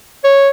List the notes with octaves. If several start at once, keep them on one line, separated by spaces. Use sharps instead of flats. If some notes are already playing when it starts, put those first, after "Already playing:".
C#5